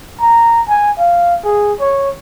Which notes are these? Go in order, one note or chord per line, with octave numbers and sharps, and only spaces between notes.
A#5
G#5
F5
G#4
C#5